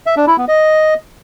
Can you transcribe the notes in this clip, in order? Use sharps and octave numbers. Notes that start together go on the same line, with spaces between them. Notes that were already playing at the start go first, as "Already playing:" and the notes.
E5
D4
E4
B3
D#5